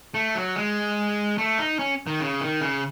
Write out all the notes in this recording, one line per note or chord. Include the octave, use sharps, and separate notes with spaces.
A3
F#3
G#3
A3
D#4
C#4
D#3
C#3
D#3
C#3